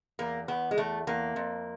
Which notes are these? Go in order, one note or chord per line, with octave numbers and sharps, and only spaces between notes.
E2 A#3
E2 B3
G#3
E2 A3
E2 A#3
F2